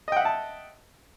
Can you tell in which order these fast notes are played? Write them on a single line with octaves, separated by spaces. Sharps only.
D#5 G5 F#5 E5 A5